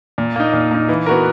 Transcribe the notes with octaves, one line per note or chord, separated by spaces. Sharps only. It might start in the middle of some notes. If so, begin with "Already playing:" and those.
A#2
A#3 D#4
A#2
A#3 D#4
E3
B3 F#4 A#4